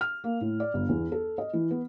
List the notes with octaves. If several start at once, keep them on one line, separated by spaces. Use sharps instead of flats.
F6
A#3
A2
D5
G1
E2
A4
D#5
E3
B3